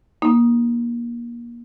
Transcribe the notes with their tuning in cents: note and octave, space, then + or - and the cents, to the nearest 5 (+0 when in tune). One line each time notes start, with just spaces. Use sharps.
A#3 +25 D#4 +0